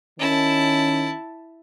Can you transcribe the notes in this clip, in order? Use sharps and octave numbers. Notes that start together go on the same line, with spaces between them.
D#3 C#4 E4 A5